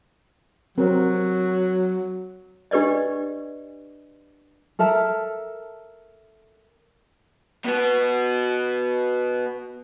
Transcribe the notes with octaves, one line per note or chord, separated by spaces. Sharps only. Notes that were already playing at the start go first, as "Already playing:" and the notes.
F#3 C4 A#4
D4 G4 B4 D5 D#5
A4 A#4 E5 A5
B2 B3